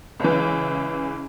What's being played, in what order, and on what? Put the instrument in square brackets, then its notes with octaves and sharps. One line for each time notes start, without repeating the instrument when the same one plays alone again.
[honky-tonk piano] C#2 C#3 E3